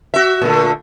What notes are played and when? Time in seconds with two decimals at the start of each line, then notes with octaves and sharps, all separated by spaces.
0.14 F#4 E5
0.42 A#2 D3 A3